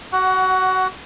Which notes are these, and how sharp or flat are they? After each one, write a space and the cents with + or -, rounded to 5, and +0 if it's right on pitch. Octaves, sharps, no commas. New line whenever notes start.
F#4 +20 F#5 +5